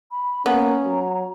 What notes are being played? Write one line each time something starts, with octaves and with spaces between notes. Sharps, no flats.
B5
A#3 B3 C#4 A#5
F#3